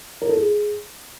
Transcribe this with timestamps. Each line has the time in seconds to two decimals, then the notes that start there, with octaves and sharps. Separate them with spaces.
0.22 A#4
0.29 A4
0.37 G#4